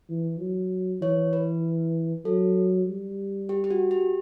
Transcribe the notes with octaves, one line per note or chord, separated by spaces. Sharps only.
E3
F#3
E3 C#5
B4
F#3 A4
G3
G4
G4
F#4
G4